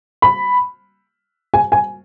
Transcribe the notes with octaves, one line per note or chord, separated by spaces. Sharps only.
B5
G#5
G#5